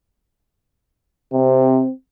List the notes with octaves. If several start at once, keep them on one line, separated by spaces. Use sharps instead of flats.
C3 C4